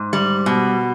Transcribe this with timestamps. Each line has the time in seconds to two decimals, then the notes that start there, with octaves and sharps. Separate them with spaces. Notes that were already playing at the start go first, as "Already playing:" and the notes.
Already playing: G#2
0.13 G3
0.46 B2